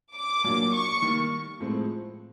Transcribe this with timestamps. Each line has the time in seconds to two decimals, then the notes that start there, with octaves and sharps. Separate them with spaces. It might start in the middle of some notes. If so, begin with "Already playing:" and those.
0.15 D6
0.44 A#2 F#3 A#3 D4
0.73 C#6
1.02 D#3 G3 A#3
1.60 A2 F3 G#3 C4